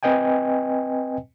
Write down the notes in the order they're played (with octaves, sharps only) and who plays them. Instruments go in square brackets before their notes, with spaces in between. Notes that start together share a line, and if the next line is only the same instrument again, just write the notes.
[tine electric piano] C4 B4 D#5 G5 G#5